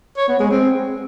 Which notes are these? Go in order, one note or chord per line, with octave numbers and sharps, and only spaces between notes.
C#5
B3
G#3
C4